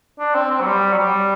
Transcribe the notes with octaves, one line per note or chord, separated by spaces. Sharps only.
D4
C4
C4
F#3
G3
F#3
G3